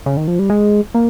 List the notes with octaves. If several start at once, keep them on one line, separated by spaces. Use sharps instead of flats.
C#3
D#3
F3
G3
G#3
A#3